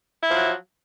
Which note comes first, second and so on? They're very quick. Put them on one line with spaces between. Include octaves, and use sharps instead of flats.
E4 F3 F#3